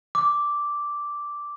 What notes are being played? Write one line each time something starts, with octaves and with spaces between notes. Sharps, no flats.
D6